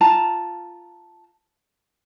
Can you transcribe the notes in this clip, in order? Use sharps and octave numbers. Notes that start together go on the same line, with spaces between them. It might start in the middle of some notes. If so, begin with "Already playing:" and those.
F4 A5 A#5